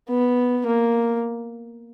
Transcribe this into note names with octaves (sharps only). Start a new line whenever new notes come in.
B3
A#3